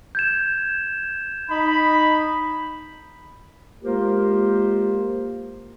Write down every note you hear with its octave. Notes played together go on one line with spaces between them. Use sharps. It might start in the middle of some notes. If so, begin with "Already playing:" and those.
G6 G#6 E7
D#4 B5
G#3 A#3 F4 G4 A#4 C5